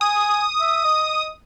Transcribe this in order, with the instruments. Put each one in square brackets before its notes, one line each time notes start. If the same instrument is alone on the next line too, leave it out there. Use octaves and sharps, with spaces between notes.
[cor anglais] G#5 [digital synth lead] D#6
[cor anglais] E5
D#5